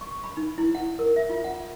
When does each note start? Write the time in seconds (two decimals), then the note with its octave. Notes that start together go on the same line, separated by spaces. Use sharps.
0.01 C#6
0.24 B5
0.37 D#4
0.58 E4
0.75 F#5
0.99 A#4
1.16 E5
1.30 F4
1.44 F#5